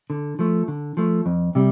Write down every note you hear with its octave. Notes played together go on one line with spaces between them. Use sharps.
D3
F3 A3
D3
F3 A3
F2
C3 G3